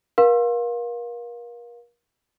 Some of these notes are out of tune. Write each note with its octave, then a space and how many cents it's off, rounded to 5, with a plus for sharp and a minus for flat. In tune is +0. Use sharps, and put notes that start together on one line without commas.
A#4 +40 F5 +20 C6 +35